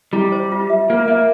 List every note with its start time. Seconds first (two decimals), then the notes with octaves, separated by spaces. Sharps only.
0.13 G3 E4
0.32 C5
0.52 F4
0.70 E5
0.90 A#3 F4
1.08 A#3 E5